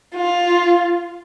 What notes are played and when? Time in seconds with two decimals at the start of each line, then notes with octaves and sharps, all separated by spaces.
0.15 F4